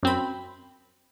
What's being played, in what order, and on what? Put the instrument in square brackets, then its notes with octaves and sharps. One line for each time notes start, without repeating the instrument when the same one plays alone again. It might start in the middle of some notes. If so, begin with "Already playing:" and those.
[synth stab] F#2 C4 B5